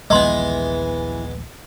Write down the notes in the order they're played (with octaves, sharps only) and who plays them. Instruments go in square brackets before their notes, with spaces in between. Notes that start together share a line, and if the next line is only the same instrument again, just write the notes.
[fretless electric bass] A#1 D#2 F3 [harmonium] E3 [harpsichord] G#3 B3 [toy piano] D#5 C6